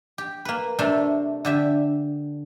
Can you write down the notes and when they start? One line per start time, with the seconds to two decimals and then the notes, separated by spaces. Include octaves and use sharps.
0.18 G4
0.45 A#3 B4
0.79 C3 A3 D4
1.45 D3 G4 E5